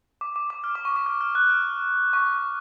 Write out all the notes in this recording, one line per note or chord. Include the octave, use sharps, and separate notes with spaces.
D6
D6
D6
F6
D6
C#6
D6
F6
F6
F#6
F6
C#6